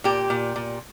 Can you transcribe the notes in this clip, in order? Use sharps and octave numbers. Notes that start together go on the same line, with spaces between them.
A#2 G4
A#2
A#2